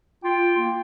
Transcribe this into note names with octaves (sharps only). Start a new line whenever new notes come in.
F4 G5
A#3